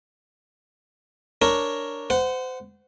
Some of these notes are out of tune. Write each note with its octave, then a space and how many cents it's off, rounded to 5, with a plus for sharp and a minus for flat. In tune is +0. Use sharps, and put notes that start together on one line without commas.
D4 +0 A#4 +0 C#5 +0
C5 -30 F#5 +0